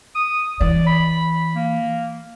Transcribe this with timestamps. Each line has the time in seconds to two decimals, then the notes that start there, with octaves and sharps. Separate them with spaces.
0.15 D#6
0.61 E3 D5
0.87 B5
1.55 A#3